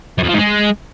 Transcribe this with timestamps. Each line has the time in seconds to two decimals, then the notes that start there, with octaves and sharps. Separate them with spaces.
0.18 F#2
0.23 F2
0.28 F3
0.33 G#2
0.38 G#3